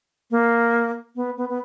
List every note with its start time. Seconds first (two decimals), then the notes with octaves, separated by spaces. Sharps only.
0.31 A#3
1.16 B3
1.37 B3
1.49 B3